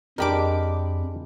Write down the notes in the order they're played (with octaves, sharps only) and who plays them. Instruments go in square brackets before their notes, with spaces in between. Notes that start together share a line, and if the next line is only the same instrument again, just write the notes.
[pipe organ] F2 [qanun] G#3 B5 D6 [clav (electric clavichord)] D4 G4 A#4